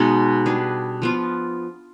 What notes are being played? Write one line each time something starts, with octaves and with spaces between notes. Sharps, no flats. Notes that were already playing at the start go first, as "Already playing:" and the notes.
Already playing: B2 G#3 B3 D#4
G3 D4 G#4 B4
F3 B3 F4